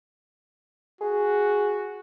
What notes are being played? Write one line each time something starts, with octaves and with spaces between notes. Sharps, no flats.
F#4 G#4